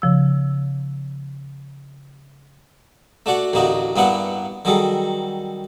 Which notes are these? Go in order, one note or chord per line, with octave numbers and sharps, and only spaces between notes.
C#3 F3 E6
A3 D4 F#4 D5 F#5
A1 D2 A#3 D4 D#4 F#4
G2 A#3 B3 D4 E4 F#5
D#3 F#3 G3 G#4 A4